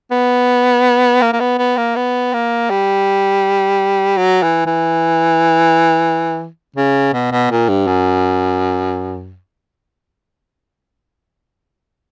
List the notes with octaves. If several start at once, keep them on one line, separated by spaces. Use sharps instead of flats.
B3
A#3
A#3
B3
B3
A#3
B3
A#3
G3
F#3
E3
E3
C#3
B2
B2
A#2
G2
F#2